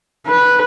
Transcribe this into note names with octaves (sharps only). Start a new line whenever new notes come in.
B4